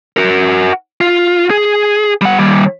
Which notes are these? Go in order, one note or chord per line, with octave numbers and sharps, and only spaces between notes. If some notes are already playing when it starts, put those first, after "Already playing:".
F#4 A#4
F4
G#4
G3 F#5
D#2 G3